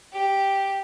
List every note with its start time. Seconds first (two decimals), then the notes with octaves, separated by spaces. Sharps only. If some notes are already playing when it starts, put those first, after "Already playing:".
0.13 G4